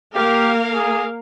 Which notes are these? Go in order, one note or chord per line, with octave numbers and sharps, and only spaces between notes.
A#3 G4 A#4 F5
G#4